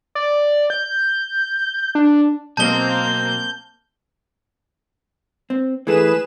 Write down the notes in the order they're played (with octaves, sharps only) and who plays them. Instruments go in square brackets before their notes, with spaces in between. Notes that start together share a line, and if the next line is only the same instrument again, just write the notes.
[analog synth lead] D5
G6
D4
[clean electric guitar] B2 F#3 D#5 [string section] A#3 C4 [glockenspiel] A5 G7 [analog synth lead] G6
[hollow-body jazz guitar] C4
[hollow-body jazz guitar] E3 A3 [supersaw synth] G#4 B4 E7